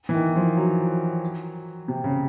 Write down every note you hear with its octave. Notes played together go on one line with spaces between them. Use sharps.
E3
D#3
F3
F#3
C3
C#3